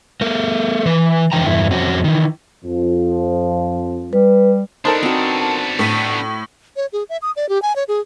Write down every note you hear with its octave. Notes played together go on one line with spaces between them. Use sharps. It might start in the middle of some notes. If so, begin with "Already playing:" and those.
A3 A#4
E3 B4
F2 D3 E3 G5 A#5
E2 G2 E4
F2 C4 C#4 F#4
D#3 E3
F2 F3
G3 B4
B3 D4 D#4 A4 A#4 C5
C4 F#4
A2 B6 D#7
C#5
G#4
E5
D#6
D5
G4
G#5
C#5
G#4